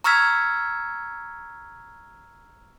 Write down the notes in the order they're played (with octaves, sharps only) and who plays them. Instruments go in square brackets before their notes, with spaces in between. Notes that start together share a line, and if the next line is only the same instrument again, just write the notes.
[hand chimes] A#5 C#6 E6 F6 G#6 B6